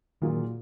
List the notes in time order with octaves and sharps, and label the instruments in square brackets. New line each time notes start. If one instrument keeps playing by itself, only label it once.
[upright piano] A#2 F#3 A#3 F4 G#4 [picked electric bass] D#3